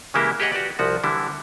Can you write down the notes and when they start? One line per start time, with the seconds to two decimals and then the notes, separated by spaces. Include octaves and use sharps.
0.14 C#3 E3 G#3 A#3 E4 G4
0.40 G4 G#4 C#5 D#5 F#5
0.52 F#4 G4 B4 D5
0.79 C2 F3 F#4
1.04 D3 E3 G3 E4